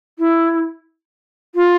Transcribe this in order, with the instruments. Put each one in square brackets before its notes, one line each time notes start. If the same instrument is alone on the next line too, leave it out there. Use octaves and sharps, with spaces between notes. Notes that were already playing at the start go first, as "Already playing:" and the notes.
[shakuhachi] E4
F4